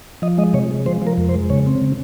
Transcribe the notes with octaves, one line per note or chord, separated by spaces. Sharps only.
F3 D#5
G#3 D#5
C3 C#5
G#3
F3 C5
F3
A#4
F2
C5
G#3
C#3 C#5
C4
C#3